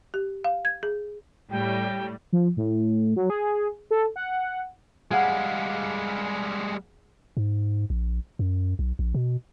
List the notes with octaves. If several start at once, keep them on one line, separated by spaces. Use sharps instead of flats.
G4
F5
G#6
G#4
A2 G3 G5
F3
A2
F#3
G#4
A4
F#5
G3 G#3 G#4 F5 F#5
G#2
A#1
F#2
B1
A#1
B2